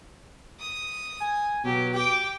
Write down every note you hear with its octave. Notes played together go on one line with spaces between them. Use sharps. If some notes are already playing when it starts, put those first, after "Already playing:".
D#6
G#5
B2 F#3 G4
G4 G5 D6